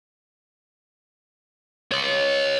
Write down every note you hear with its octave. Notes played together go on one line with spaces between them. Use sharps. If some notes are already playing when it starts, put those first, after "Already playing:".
C#5 D#5